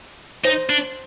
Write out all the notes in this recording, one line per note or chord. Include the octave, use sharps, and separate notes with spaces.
D#4 C5
D4